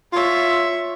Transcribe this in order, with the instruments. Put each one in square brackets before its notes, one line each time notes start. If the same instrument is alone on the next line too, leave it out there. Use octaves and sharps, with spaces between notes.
[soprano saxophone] F4 [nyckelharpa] C#5 E5